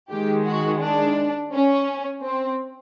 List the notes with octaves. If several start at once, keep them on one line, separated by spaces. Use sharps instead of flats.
D#3 G#3 G4
F#4
D4
C#4
C4